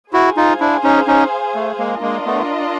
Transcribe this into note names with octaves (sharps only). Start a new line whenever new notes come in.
E4 F#4 G#4 C5 F5 G#5
D#4 F4
D4 E4
C#4 D#4
C#4 D#4
A3
G#3 A#3
G#3 A#3 D4 F4 A#4 D#5
A3 B3